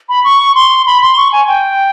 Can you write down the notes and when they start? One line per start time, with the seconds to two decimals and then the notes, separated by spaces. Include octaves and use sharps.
0.09 B5
0.24 C#6
0.55 C6
0.86 B5
1.02 C6
1.17 C#6
1.32 G#5
1.47 G5